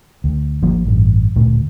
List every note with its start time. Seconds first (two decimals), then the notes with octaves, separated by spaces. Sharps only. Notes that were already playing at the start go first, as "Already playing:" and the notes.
0.24 D2
0.62 G#1 F3 A#3
0.85 A1 G2
1.36 D1 D2 A#2 A3